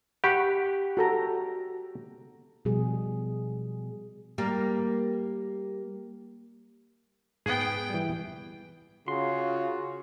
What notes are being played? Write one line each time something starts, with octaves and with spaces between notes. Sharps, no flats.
G4 F#5 B5 C#6
F#4 A4 A#5
B2 F3 G3 G#4
G3 A#3
G#2 B3 G#4 G5
E3 G3
C#3 F4 F#4 C6